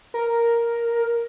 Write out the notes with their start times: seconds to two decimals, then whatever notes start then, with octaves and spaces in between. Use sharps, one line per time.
0.14 A#4